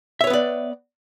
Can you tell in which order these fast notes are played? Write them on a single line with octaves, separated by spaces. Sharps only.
E5 C#5 B4 B3 D5